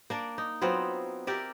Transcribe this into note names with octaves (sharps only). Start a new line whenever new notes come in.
A#3 D4 D5
D#4
F#3 B3 C4 F4
G4 A#4 D5 E5